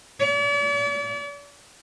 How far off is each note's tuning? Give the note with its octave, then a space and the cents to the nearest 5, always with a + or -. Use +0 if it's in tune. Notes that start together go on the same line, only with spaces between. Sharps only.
D5 -45